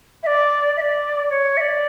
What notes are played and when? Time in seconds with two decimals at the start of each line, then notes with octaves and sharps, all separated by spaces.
0.23 E5
0.26 D5
0.76 E5
0.80 D5
1.30 C#5
1.57 E5
1.60 D5